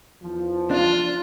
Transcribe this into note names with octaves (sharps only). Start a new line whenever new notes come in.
E2 F3
D4 F4